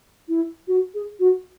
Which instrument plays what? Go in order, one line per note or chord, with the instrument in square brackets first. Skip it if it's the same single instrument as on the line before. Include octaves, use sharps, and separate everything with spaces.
[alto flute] E4
F#4
G#4
F#4